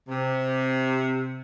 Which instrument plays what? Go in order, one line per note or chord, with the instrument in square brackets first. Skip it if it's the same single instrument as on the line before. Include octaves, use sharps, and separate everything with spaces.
[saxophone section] C3